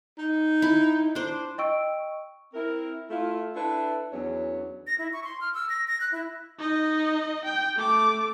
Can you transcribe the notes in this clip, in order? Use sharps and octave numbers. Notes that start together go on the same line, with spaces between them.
D#4
E4
D4 C5
D#5 G5 C#6 E6 D7
C4 E4 A#4
A3 E4 F4
D4 E4 A4 B4 E5
E2 F#3 C#4 D4 C#5
A#6
E4
C#6
C6
F6
E6
A#6
A#6
F#6
E4
D#4 D#5
G5
A3 D6